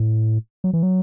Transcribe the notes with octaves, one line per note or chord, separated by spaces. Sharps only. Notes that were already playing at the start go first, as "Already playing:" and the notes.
Already playing: A2
F#3
E3
F#3